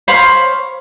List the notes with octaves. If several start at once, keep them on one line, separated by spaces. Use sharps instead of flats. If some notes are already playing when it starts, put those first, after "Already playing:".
C5 C#5 F5 B5